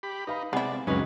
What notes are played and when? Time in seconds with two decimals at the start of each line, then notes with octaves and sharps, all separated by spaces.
0.03 G4 B5
0.27 D#4 B4 F5 B5
0.53 C3 G#3 B3 E4 G#4 D5
0.87 C#2 F#2 C#3 F#3 G#3 C#4 D#4 B4